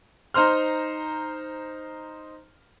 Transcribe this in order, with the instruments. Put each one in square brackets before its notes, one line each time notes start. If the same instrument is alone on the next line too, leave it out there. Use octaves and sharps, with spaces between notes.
[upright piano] D#4 C5 A#5 C6 F6